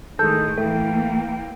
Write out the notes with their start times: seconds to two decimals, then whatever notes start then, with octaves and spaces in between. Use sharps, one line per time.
0.19 A2 D#3 G#3 G#4 A4 G6
0.58 E3 A3 A#3 G5